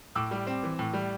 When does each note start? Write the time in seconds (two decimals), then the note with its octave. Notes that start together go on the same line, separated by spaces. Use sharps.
0.15 A2 D6 E6
0.31 G3
0.47 C4
0.63 E3
0.79 A2
0.94 G3